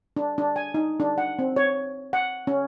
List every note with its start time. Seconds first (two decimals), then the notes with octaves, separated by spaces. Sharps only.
0.17 D4
0.38 D4
0.56 G#5
0.74 D#4
1.00 D4
1.18 F#5
1.39 C4
1.56 C#5
2.13 F#5
2.47 C#4